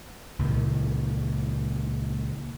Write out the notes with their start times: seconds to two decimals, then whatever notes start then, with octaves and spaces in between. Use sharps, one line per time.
0.39 C#2 A#2 D#3 E3